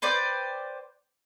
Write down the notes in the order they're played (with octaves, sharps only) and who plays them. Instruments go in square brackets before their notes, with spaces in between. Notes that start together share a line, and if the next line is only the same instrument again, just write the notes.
[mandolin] B4 C5 D5 G5